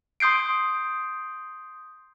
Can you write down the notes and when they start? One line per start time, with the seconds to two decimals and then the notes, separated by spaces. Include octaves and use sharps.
0.20 C6 D#6 G6 C7 D7